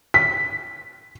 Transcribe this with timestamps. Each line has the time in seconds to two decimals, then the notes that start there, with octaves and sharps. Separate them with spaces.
0.14 B6